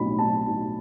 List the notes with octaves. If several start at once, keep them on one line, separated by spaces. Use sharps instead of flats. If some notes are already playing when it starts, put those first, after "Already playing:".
Already playing: B1 A2 B5
B1 A5
B1